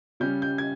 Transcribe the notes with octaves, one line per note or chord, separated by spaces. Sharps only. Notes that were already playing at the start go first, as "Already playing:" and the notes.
C#3 G3 C#4 G6
G6
G#6